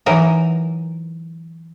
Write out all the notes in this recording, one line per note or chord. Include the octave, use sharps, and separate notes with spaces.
E3 F#3 D#4 A#4